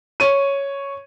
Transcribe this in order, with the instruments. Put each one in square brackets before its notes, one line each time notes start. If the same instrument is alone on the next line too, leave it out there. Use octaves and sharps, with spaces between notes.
[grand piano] C#5 D#7